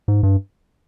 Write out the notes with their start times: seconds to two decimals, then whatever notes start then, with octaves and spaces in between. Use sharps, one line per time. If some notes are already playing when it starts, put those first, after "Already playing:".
0.08 G#2
0.23 G2